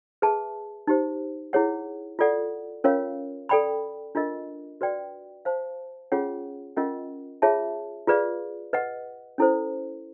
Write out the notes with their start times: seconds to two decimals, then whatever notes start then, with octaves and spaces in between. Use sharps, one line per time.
0.22 G#4 B4 E5 A5
0.87 D#4 G4 C5
1.53 E4 G#4 C#5 F#5
2.19 F4 A4 D5 F#5
2.84 C#4 F4 A#4 C#5 F5
3.49 A4 D5 G5 B5
4.15 D4 F4 A#4 D#5
4.81 F#4 B4 D5 G5
5.45 C5 F5 A5
6.12 C#4 F4 G#4 C#5 F#5
6.77 C#4 F4 A#4 D#5 F#5
7.42 F4 G#4 C#5 E5 A5
8.07 F4 G#4 B4 D5 F5
8.73 B4 D#5 F#5
9.38 C#4 E4 A4 C5